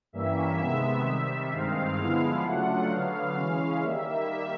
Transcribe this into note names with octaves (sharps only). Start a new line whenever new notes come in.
G2 E3 G3 A#3 C#4 E5
C3 D#3 G#3 B3
C3 D#3 G3
G2 D#3 G#3 C4 F5
D3 F3 G#3 B3 E4
C#3 F#3 A3 D4 F4 F#5
D3 F#3 B3 F5
C#3 E3 G#3 C#4
D#3 G3 A#3 E5